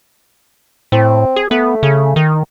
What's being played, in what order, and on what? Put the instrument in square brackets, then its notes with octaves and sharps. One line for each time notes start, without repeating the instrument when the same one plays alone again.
[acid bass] A2 [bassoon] C4
[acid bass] G#4
[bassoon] A3 [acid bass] B3
[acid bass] C#3
D#3